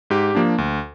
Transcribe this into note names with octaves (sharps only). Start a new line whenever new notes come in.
G#2 G4
F3 A#3 D4
D2